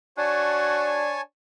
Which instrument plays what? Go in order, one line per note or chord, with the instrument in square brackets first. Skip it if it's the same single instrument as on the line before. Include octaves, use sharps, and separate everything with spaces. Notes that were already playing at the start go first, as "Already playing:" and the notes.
[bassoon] D4 [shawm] F#4 [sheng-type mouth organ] C#5 G#5 A5